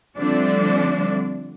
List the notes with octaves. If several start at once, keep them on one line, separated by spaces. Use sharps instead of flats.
D3 F3 G3 A3 C4 D4